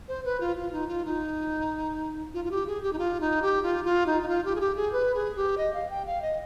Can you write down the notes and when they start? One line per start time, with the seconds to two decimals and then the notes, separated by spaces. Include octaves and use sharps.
0.08 C5
0.25 B4
0.40 F4
0.57 F4
0.73 D#4
0.88 F4
1.05 D#4
2.34 F4
2.45 F4
2.51 G4
2.67 G#4
2.82 G4
2.93 D#4
2.99 F4
3.20 D#4
3.42 G4
3.63 F4
3.85 F4
4.07 D#4
4.22 D#4
4.28 F4
4.45 G4
4.56 G#4
4.60 G4
4.76 G#4
4.93 B4
5.15 G#4
5.36 G4
5.58 D#5
5.74 F5
5.90 G5
6.07 F5
6.22 D#5